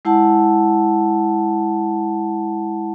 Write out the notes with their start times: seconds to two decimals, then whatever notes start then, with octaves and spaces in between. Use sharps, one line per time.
0.05 G#3 E4 F#5 A5